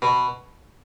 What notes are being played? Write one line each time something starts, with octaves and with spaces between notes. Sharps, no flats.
B2